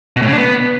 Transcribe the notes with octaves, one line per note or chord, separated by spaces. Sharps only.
B2
A2
C#3
D4
B3